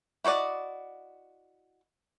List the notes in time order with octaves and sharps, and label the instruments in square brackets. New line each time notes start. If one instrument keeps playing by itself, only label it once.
[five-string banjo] E4 F#4 C5 D5 D#5